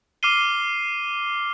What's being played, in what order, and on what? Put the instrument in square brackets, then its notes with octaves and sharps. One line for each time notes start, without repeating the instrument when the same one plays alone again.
[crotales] D6 F6 C7 D#7 G7